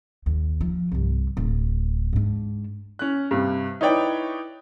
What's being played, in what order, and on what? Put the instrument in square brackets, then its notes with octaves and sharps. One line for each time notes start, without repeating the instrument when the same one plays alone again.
[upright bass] D#2
F3
C2 G2
D1
G#2 D4
[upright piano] C#4 F#6
G2 C3
D#4 E4 B4 C#5 D5 G5